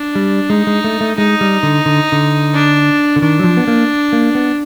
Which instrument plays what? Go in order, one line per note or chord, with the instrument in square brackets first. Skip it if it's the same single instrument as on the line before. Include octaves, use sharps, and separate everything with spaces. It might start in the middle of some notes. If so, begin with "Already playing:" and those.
Already playing: [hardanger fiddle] D4
[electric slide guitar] G3
[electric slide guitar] G#3 [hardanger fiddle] D#4
[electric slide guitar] G#3
A3
A3
[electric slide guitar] G#3 [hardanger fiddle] D#4
[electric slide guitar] G3
D3
D3
D3
[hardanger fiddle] D4
[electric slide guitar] D3
[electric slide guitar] D#3 [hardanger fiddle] D4
[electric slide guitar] F#3
F3
B3
A#3
A#3
B3